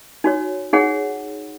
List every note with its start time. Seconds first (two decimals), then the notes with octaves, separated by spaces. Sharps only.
0.24 D#4 F#4 C#5
0.73 D#4 G#4 C#5 F#5